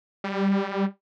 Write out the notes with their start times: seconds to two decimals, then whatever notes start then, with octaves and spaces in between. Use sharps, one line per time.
0.24 G3